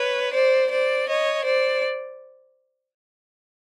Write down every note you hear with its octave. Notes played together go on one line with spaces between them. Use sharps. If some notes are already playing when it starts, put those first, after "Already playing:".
Already playing: B4 C#5
C5 D5
C5 D5
C#5 D#5
C5 D5